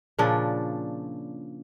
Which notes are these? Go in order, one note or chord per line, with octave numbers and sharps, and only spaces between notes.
A#2 C#3 F3 D4